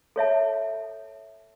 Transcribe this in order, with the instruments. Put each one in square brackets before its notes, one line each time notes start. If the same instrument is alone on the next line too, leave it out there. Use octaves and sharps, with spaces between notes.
[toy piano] A4 C#5 E5 A5